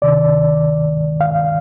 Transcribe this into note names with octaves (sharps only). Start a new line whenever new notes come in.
D2 C3 D#3 D5
F5